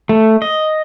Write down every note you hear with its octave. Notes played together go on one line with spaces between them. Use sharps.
A3
D#5